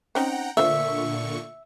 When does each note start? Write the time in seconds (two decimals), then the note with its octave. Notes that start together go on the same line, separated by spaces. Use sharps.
0.15 C4 C#4 D#4 F#5 G5 A#5
0.57 A#2 D3 A3 F4 C5 E5 C#6